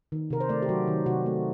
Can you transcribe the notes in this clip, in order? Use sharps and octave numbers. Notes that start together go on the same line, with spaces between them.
D#3
C3 A#4
C5
A3 D5
G4
F#3 F#4
D#3
C3 F#4
A3